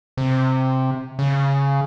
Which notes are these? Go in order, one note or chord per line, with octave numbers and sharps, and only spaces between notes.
C3
C#3